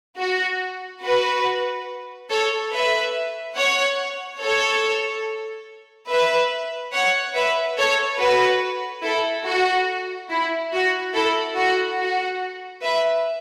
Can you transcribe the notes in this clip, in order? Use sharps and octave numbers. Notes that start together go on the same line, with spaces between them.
F#4
F#4 B4
A4 C#5
B4 E5
C#5 F#5
A4 C#5
B4 E5
C#5 F#5
B4 E5
A4 C#5
F#4 B4
E4 A4
F#4
E4
F#4
E4 A4
F#4
F#4
B4 E5